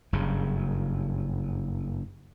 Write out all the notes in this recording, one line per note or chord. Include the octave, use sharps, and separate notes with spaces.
F#1 G2 C#3